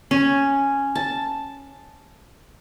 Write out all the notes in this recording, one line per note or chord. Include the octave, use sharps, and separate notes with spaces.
C#4
A5